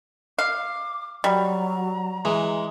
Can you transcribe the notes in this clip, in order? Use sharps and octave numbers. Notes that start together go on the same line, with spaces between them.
F5 D6
F#3 G3 A#5
E3 G#3